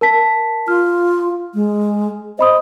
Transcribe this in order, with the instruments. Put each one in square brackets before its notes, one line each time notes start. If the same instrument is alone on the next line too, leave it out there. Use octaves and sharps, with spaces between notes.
[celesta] A#4 A5 B6
[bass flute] F4 [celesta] F6
[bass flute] G#3
[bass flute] C5 [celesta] D#5 B5 D#6